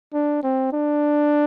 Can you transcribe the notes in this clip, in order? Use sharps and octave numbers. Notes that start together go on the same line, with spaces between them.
D4
C4
D4